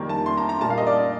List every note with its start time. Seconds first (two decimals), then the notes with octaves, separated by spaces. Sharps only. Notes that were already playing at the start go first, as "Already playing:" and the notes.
Already playing: F2 D#3 G3 A#3
0.09 A5
0.26 C6
0.37 A#5
0.49 A#5
0.60 A#2 G3 A#3 A5
0.70 F5
0.78 D#5
0.87 D5